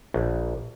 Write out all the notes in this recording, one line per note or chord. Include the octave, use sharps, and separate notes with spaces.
A#1